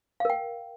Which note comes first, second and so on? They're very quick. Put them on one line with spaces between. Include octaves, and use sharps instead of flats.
F5 A#4 G5